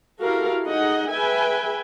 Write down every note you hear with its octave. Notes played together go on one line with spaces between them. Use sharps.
E4 F#4 G4 A4 A#4 F5
D#4 G#4 D#5 F#5
G#4 B4 E5 G5 G#5